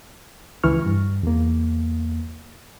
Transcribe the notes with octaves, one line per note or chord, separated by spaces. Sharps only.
C#2 E3 E4 C#6 F6
G2
E2 A#3